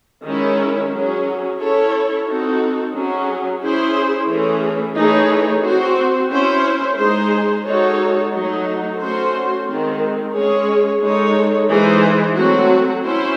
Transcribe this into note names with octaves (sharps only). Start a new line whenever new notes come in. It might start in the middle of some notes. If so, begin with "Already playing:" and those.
D#3 G#3 C#4 E4
F#3 C#4 G#4
C#4 E4 A4 C#5
C4 D#4 F#4 A4
F#3 C#4 G#4
C#4 E4 G#4 C5
E3 A3 C#4 G#4
E3 A3 D#4 G#4 C#5
C4 F#4 C5
C#4 E4 C5
G#3 D#4 G#4 C5
G#3 D#4 F#4 A4 C#5
F#3 A3 D#4
A3 C#4 F#4 C5
D#3 G#3 C4
G#3 C#4 G#4 C#5
G#3 D#4 A4 C#5
E3 G#3 D#4 G#4 C5
F#3 A3 C4 F#4
C#4 E4 C5